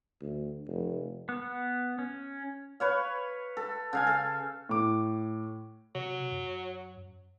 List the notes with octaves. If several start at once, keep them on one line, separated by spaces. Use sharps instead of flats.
D2
F1
B3
C#4
B4 C#5 F5
A4
C#3 F5 G#5
A4
A2 D6
C3 F#3
F#2